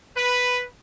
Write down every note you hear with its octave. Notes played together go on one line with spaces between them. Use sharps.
B4